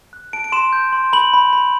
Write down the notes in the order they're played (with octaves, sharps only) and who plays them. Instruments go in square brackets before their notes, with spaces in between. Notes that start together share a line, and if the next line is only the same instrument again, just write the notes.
[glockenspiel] F#6
A5 D7
D7
C6 E7
G6
C6
B5 F#7
B5
B5